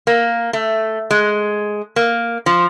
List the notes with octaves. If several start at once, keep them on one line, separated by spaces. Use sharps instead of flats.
A#3
A3
G#3
A#3
F3